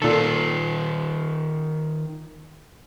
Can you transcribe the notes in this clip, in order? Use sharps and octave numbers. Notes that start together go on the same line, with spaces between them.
A#2 D#3 F4 A4